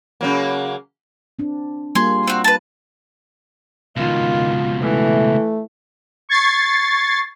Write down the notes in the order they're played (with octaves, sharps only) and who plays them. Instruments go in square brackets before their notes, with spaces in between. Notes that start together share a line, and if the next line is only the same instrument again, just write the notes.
[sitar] C#3 F#3 A#3
[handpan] C4 D4
[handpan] G3 A#3 F4 [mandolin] G#4 C6
[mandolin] C4 F#4
B4 A5
[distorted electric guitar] C#2 B2 [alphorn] D#3 [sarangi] F4
[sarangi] E3 [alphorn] A3
[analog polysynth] C#6 G#6 A6 C7